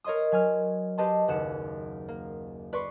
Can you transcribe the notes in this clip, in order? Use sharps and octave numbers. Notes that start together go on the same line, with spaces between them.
A#4 C#5 D#5 C6 D#6
F#3 G#5 F6
G4 B4 D#5 A5 C6
F#1 D#2 F#5 E7
A#3
B4 D5 C6 C#6